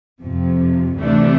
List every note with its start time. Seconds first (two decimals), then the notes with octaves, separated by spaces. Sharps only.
0.23 F2 C3 F3
0.99 D2 C3 E3 A3 D4